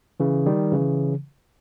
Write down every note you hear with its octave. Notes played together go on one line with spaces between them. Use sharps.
C#3 E3
D#3 G3
C#3 E3